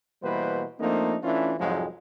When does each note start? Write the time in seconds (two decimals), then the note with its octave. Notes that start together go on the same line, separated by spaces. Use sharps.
0.23 B2 E3 G3 A#3 B4 C5
0.80 F3 A3 A#3 C4 D4 D#4
1.24 E3 A3 C#4 D4 E4 F4
1.59 C2 F2 G#2 F3 F#3 G#3